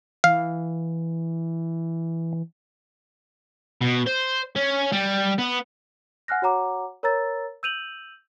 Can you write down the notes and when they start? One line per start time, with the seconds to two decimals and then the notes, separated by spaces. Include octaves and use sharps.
0.24 E3 F5
3.81 B2
4.07 C5
4.56 C#4
4.92 G3
5.38 B3
6.28 F#5 G#5 F6 F#6 A#6
6.42 F#4 C#5 F#5 A#5 D6
7.03 A#4 C#5 A#5 E6 A6
7.63 E6 G6 D#7 F7 F#7